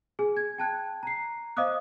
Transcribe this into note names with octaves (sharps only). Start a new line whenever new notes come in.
G#4 G#5
G#6
G5 A5 F#6 G#6
A#5 C7
C5 D#5 F5 D6 D#6 F#6